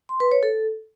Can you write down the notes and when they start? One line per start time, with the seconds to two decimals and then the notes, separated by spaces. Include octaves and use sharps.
0.09 C6
0.20 B4
0.32 C#5
0.43 A4